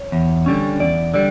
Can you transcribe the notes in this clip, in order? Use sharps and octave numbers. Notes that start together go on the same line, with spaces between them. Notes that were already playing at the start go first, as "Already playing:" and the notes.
Already playing: C#5
E2
D3 G3 C#4
E2 D5
D3 G3 D5